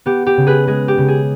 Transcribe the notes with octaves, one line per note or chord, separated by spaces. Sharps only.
B3 G4
G4
C#3
G#4 B4
G#3 G#4
G4
C#3
G#4